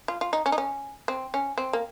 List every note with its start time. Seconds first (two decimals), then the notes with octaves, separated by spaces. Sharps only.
0.08 F4
0.21 F4
0.33 D#4
0.46 C#4
0.52 D#4
0.58 C#4
1.08 C4
1.34 C#4
1.58 C4
1.73 A#3